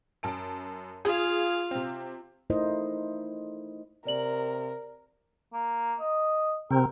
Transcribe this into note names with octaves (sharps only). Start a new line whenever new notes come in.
F#2 A5 D7
F4 G#4 F5
C3 C4
A3 D#4 E4 A#4 C5 D#5
C3 A#4 D5 F#7
A#3
D#5
C3 C4 A#4